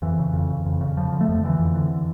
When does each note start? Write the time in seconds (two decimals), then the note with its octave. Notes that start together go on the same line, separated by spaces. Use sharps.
0.02 F2 E3
0.19 C#3
0.33 F2
0.50 C#3
0.66 F2
0.81 C#3
0.97 F2 F3
1.12 D3
1.21 A3
1.29 F2
1.44 D3 E3
1.59 F2
1.75 D3